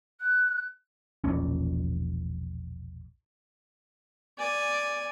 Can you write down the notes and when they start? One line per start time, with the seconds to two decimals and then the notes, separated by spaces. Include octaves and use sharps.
0.20 F#6
1.24 E1 A#1 A#2 C#4
4.38 D5 G#5